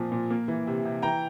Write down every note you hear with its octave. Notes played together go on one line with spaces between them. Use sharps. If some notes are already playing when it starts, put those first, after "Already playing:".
Already playing: A#2 F3 C4
A#2
A#3
E3
C3
C3
E3 G5 A#5